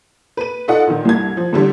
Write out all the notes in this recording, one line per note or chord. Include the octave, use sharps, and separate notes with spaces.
B4 D#7
D#4 F4 A4 D#5 F#5
A#2 D#3
C2 G2 G#6
F3
A1 D3 G3 A3